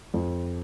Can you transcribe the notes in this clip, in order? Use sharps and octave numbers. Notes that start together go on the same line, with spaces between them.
F2